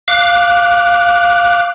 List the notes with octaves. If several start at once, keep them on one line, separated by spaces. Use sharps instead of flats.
F5 D6 F#6